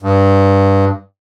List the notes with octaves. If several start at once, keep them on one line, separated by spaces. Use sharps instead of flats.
G2